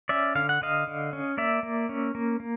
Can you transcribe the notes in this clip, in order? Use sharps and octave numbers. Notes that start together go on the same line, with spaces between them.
C#4 D5 E5
D3 F5
F#5
D3 D#5 F5
D3
C#4
A#3 D5 E5
A#3
C#4
A#3
A#3